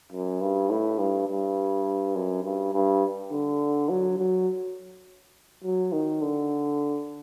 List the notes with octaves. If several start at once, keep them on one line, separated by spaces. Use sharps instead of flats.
F#2
G2
A2
G2
G2
F#2
G2
G2
D3
F#3
F#3
F#3
D#3
D3